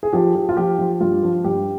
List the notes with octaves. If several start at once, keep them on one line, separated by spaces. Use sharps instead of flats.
G#4
F3 G4
F3
F4
F3 G4
F3
G2 F4
F3
G2 G4